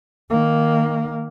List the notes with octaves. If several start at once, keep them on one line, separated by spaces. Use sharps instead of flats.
D#3 A#3